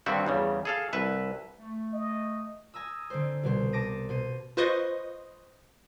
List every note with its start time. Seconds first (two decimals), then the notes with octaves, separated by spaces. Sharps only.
0.06 G2 D3 D#3 C4 F#4 E5
0.26 E2 C#3 G3
0.65 G#4 A4 F5
0.93 C2 B4 E5
1.58 A3
1.94 D#5
2.74 G#5 A#5 D#6 E6
3.10 D3 C4 C5
3.43 C2 B2 C5
3.73 A5 D6 A#6 D#7
4.09 B2 C5 D#7
4.57 F4 B4 C5 D#5 C#6 D#6